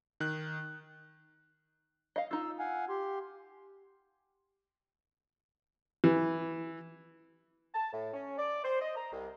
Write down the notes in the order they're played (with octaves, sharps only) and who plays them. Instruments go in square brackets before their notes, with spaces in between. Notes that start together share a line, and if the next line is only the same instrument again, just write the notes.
[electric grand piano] D#3 F#6
[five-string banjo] D#5 F5
[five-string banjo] D#4 F4 [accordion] E6
[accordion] F5 F#5 G#5
G4 C6
[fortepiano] E3
[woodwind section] A5
A2
C#4
D5
C5
D#5
A#5
C2